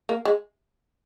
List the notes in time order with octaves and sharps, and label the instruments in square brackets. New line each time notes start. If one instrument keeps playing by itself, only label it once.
[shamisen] A#3
G#3